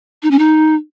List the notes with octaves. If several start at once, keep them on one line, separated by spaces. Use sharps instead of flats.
D#4
C#4
D#4